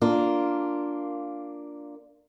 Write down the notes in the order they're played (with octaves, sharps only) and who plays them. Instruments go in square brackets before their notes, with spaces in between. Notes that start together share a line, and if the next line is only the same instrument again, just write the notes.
[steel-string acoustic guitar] A#3 D4 F4